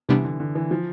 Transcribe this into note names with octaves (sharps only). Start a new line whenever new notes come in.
C3 E3 G3 B3 D4
D3
D3
E3
F3